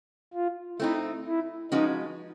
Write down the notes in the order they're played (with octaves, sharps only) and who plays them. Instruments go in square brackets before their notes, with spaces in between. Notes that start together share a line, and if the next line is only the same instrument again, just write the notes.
[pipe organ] F4
[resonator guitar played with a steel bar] A3 C4 D#4 [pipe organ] E4
[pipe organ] E4
[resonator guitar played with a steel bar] F3 G#3 C#4 F#4 B4 [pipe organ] D#4